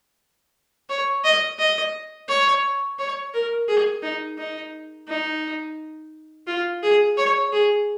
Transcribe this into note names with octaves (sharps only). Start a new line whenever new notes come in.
C#5
D#5
D#5
C#5
C#5
A#4
G#4
D#4
D#4
D#4
F4
G#4
C#5
G#4